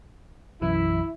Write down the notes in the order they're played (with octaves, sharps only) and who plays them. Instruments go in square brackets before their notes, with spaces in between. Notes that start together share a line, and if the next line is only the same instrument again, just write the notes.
[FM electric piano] B1 F#2 E3 [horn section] E4